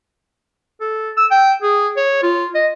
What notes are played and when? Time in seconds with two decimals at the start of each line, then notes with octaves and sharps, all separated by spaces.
0.81 A4
1.17 E6
1.31 G5
1.62 G#4
1.97 C#5
2.23 F4
2.55 D#5